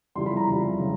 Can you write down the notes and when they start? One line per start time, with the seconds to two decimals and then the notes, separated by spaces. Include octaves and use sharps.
0.16 F2 C#3 E3 G3 C6
0.26 B5
0.37 A#5
0.47 F2 C#3 E3 G3
0.79 C#3 F#3